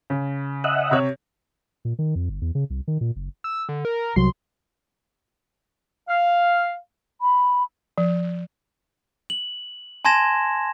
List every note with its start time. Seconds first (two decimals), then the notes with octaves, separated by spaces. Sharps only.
0.10 C#3
0.64 D#5 E5 F#5
0.91 C3 C#5
1.85 A#2
1.99 D#3
2.15 F2
2.29 G1
2.41 E2
2.55 C#3
2.70 C2
2.88 D#3
3.01 A#2
3.16 F#1
3.44 E6
3.69 D3
3.85 A#4
4.16 C2 F#3 C6
6.09 F5
7.21 B5
7.98 F3
9.30 F#7
10.05 G#5 A5 C6 G#6 A#6 E7